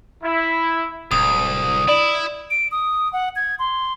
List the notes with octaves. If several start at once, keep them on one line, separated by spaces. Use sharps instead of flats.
E4
D1 C2 D#6
E4 D5
D7
D#6
F#5
G#6
C6